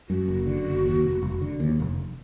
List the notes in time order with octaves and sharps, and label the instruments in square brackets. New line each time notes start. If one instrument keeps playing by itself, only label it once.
[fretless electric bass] F#2 [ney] F#4
[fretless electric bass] F#1
D3
F#1
D#2
F1
F1
D3
D#2
F1